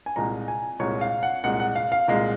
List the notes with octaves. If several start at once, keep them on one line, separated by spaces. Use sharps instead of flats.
G#5
C2 A#2 G#3 A#5
G#5
C2 A#2 G#3 C#5
F5
F#5
C2 A#2 G#3 F#5
F#5
F5
F5
C2 A#2 G#3